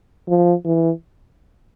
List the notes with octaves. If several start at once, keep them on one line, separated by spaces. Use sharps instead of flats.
F3
E3